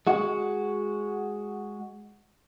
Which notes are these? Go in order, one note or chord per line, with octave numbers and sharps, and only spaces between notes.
G#3 F#4